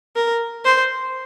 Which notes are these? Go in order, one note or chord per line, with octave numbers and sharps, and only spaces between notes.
A#4
C5